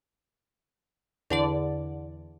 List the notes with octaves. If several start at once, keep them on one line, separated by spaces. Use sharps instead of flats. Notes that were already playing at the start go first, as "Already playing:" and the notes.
E2 D3 D5